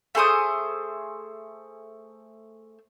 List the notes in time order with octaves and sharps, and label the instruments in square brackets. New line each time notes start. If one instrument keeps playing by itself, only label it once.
[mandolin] A3 G#4 C5 D#6